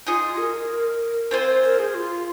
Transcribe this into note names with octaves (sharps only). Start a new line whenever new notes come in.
D#4 F4 G#4 D#5
A#4
C4 F4 C5 G#5
A#4
G#4
F4